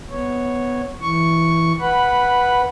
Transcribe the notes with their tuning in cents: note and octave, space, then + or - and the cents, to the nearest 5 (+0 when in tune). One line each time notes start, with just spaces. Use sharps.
B3 +0 C#5 -5
E3 +0 C#6 +0
B4 -10 F#5 +0 B5 +0